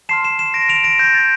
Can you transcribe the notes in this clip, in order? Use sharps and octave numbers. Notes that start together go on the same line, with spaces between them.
A5 C6 F6 C7 E7
C7 E7
C7 E7
A#6 D7
D7 F7
A#6 D7
G6 A#6
A6